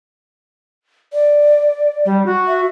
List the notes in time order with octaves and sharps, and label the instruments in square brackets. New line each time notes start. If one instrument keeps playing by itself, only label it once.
[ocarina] D5
[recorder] G3
F#4
[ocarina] E5